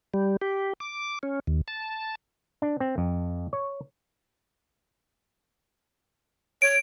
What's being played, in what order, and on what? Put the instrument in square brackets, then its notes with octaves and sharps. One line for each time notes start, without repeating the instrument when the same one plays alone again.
[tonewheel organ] G3
G4
D6
C#4
D#2
A5
[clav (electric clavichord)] D4
C4
F2
C#5
[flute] C#5 [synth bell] D7